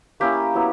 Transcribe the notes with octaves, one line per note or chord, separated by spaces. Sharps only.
A#3 C#4 E4 G4
F#3 B3 E4